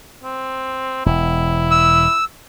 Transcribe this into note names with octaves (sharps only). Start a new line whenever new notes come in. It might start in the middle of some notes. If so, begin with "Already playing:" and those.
C4
E1 E4
E6